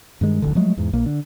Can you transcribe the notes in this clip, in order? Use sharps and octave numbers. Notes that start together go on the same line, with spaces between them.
G2 D#3 G#3
D1 A1 D3
F3 F#3 G#3 A3
E2 G#2
A#1 A#3
D3